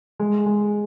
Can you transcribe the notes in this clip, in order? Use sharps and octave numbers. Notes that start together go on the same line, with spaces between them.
G#3
G#3